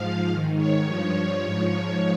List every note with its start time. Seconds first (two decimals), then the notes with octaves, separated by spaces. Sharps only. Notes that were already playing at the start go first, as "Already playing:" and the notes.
Already playing: G#2 F3 F5
0.28 G#2 D#3
0.57 C#5
0.86 G2 F3 C#5
1.15 C#5
1.43 G#2 F3